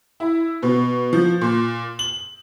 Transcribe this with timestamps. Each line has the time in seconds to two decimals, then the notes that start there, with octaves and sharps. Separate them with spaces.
0.20 E4
0.63 B2
1.13 F3
1.41 A#2
1.99 F#7